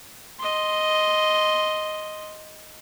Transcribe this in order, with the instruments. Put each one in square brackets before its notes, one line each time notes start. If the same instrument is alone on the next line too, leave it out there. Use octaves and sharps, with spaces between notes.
[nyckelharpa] D#5 C6